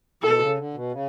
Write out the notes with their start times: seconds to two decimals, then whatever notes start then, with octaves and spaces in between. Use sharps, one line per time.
0.23 B2 A4
0.40 C#3
0.58 D3
0.74 B2
0.92 C#3